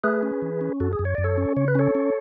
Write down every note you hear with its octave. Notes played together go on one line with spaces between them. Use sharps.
A3 G#4 B4
C#4
E3
C#4
F#2 F#4 A4
G#4
F#2
C#5
F#2 D5
A4 C#5
C#4
C#3 C#5
B4
C#4 A4 C#5
C#4